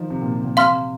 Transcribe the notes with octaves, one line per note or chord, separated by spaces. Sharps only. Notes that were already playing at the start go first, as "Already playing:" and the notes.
Already playing: D#3 F3
C3
A#2
C3
A#2
C3 F5 C6 F6